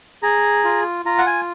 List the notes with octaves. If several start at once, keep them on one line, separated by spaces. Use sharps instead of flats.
G#4 A#5
F4
F4 A#5
F#5
G#5